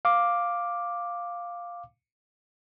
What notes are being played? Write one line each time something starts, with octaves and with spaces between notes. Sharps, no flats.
F5 D6